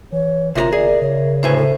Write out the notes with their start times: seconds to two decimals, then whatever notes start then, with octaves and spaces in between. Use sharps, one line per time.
0.12 E3 C#5
0.55 G1 C3 F4 A#4 D#5 E5 A#5
0.73 G#4 D5
1.02 C#3 C#5
1.43 D2 A2 B4 C5 E5 G#5
1.57 A4